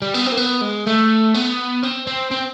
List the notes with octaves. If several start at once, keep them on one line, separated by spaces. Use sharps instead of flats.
G3
B3
C4
A#3
B3
G#3
A3
B3
C4
C4
C4